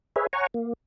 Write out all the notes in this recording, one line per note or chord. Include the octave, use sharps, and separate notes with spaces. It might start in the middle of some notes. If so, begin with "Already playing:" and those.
G#4 B4 C#5 E5
C#5 F#5 G#5 A#5 C#6
A#3